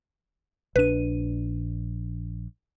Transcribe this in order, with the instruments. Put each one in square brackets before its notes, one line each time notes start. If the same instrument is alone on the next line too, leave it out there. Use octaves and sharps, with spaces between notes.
[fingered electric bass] A#1 D4 [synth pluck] B4 D#7